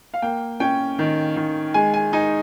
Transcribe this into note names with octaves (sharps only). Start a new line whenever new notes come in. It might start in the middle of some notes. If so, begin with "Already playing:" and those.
F5
A#3 G5
C#4 G5
D#3
D#3
G#3 G#5
G#5
D#4 G#5